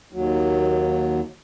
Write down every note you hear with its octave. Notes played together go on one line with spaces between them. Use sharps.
D#2 F#3